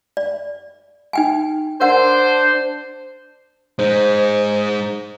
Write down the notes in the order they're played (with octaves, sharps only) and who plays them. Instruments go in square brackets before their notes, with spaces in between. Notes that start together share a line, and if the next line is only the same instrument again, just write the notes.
[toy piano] D5
D#4 G5 G#5
[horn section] D4 C5 [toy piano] A#4 F#5
[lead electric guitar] G#3 D#4 [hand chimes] C5 G6